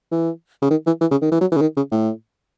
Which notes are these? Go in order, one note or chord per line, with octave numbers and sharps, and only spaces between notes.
E3
C#3
D#3
E3
E3
C#3
D#3
E3
F#3
E3
C#3
D#3
C#3
A2